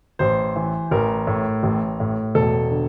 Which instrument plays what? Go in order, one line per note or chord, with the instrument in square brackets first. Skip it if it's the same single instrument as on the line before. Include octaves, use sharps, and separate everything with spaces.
[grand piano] A1 C5
E3
A1 A#4
A2
A1
A2
E1 A4
D3